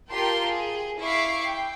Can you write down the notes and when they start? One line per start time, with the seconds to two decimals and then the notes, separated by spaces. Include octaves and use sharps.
0.12 F4 G4 A#4 G5 A5 C6
0.50 G#4
1.00 E4 E5 F5 C#6 D6 C7
1.45 G5